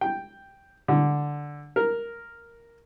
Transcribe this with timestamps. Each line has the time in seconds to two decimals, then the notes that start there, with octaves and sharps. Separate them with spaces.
0.01 G5
0.88 D3
1.76 A#4